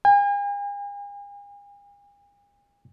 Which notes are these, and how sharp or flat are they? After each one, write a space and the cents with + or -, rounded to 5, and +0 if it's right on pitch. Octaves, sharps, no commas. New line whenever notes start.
G#5 -45